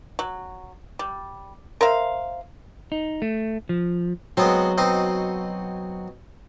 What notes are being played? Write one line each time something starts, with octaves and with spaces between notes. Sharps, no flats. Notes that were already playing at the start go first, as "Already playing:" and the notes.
F#3
G3
A#4 C5 E5 F5
D#4
A3
F3
F#3 G#3 B3 C4
B2 C4 D#4